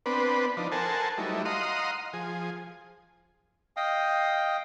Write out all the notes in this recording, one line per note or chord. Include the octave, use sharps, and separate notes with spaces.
B3 C4 D4 B4
F3 D4 D#4
A4 A#4 C5 F#5 G#5 A5
F#3 G3 A3 D#4 E4
D#5 F5 F#5 A#5 C6 D#6
F3 G#4
D#5 F5 G5 D#6